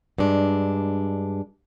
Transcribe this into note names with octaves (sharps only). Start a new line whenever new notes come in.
G2 G#3 D4